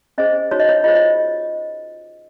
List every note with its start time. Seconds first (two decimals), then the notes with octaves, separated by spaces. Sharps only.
0.18 C#4 G#4 C5 D#5
0.51 D#4 F#4 C5 C#5
0.60 D#5
0.69 C#5
0.84 F4 G#4 C5 D#5
0.95 D#5